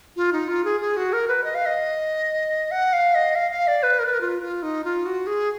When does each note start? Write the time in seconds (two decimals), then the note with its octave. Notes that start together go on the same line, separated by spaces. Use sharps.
0.16 F4
0.33 D#4
0.48 F4
0.65 G#4
0.81 G#4
0.97 F#4
1.13 A#4
1.28 B4
1.44 D#5
1.55 F5
1.66 D#5
2.71 F#5
2.93 F5
3.15 D#5
3.35 F5
3.51 F5
3.67 D5
3.83 B4
3.99 A#4
4.06 B4
4.14 A#4
4.21 F4
4.42 F4
4.63 D#4
4.84 F4
5.05 F#4
5.27 G#4